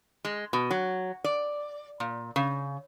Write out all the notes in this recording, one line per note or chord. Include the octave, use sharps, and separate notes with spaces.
G#3
B2
F#3
D5
A#2
C#3